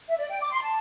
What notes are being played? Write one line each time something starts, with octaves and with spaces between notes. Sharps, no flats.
E5
D5
G5
D6
C6
A5